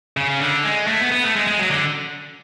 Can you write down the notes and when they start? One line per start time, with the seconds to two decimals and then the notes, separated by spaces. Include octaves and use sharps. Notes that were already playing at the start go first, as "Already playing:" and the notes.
0.17 C#3
0.40 D3
0.64 G#3
0.87 A3
1.00 B3
1.12 B3
1.24 A3
1.36 G#3
1.47 G#3
1.59 F#3
1.71 D3